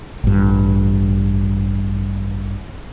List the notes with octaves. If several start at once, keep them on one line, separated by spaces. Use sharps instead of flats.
A1 G2